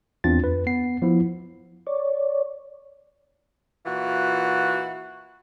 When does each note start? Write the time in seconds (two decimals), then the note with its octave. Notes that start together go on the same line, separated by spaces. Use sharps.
0.24 E2 C4 D4 F4 A6
0.43 F2 B4
0.67 B3 C7
1.02 F3 B3 E4
1.87 C#5 D5
3.86 A#2 E3 F4 F#4